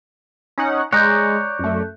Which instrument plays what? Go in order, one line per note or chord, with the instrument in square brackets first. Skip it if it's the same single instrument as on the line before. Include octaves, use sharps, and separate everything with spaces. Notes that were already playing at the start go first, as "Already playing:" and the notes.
[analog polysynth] C#4 D#4 F#5
[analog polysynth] G#3 [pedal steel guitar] C#5 D5 A#5 [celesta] F#6 G6
[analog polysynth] F#2 A3